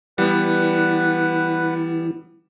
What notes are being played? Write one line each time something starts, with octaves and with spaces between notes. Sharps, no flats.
E3 G3 B3 B4 F#5